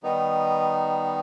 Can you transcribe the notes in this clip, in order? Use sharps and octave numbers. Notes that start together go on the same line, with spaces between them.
D#3 G3 B3 D#4